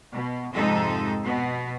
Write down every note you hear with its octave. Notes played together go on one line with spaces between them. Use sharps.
B2
F2 G#2 C3 G#3 D#4 A4
B2 B3